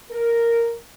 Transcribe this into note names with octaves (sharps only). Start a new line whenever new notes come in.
A#4